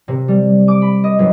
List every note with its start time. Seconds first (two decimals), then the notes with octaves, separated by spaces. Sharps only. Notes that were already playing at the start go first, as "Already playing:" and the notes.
0.08 C3
0.28 G3
0.68 D6
0.82 B5
1.04 D#5
1.19 F#1